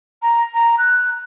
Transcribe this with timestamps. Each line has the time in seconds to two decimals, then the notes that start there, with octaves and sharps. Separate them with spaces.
0.22 A#5
0.54 A#5
0.78 F#6